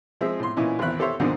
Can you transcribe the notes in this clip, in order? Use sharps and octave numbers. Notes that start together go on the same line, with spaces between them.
F3 G#3 C4 G#4 E5
A2 C6
A#2 E3 C#4 D#4 E4
G#1 E2 C4 E4 B5 F#6
G4 A4 C5 C#5 E5
D2 G#2 D3 D#3 F3 C4